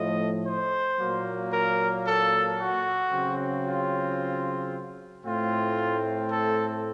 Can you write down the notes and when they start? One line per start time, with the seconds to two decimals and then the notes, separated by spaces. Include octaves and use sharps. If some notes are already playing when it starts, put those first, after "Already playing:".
Already playing: A2 F3 A3 D#5
0.46 C5
1.00 A#2 F#3 A#3
1.52 A#4
2.05 A4
2.59 F#4
3.12 C#3 F#3 C4
3.65 F4
5.24 A2 A3 C4 F4
6.30 A4